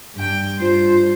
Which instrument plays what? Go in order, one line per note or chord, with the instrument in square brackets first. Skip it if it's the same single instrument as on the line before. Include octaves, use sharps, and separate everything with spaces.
[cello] G2 G5
[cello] G2 C5 [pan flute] F4